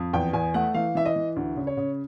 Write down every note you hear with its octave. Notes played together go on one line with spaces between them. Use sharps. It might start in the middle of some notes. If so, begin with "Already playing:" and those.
Already playing: F2
E2 G5
E2 G#5
A3 F#5
E3 F5
E3 E5
D#5
E3
D2
C#3
C#5
C#3